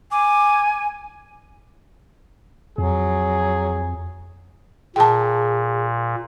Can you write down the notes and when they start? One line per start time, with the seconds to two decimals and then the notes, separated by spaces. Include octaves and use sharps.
0.12 G#5 D6
2.78 F2 F#3 G#4
4.96 A#2 G#4 G5 A5